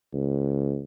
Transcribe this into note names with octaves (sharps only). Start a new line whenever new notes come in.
C#2